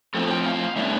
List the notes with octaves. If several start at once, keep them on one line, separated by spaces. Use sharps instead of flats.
A2 F3 C4 A4
G5
F5
A2 G3 B3 D4 E5